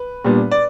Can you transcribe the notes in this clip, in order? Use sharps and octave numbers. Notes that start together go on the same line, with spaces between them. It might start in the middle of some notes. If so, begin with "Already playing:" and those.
Already playing: B4
A#2 G3 B3 D4
D5